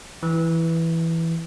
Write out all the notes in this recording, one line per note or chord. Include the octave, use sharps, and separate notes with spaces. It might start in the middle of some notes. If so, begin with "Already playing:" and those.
E3